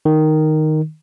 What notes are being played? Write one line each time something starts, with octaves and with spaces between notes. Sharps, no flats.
D#3